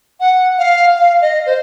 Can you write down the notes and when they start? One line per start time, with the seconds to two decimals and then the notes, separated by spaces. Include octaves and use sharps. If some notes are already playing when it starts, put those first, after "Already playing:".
0.20 F#5
0.59 F5
0.95 F5
1.22 D#5
1.46 C5